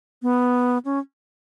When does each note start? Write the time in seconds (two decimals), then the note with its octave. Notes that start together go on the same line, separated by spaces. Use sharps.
0.22 B3
0.85 C#4